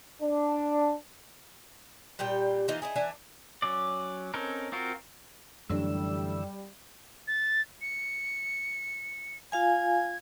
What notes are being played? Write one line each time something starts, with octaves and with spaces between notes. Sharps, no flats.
D4
A#2 G3 G4 G5
E3 A#3 D#4 F4
D#4 E4 G#4
E3 D4 E5 G#5
F#3 C#4 D5
C4 C#4 D#4 A4 A#4
C4 F4 F#4 A#4
F#2 D3 E3 F#3 G3 A3 D4 E6
A6
C#7
F4 F5 G#5 G#6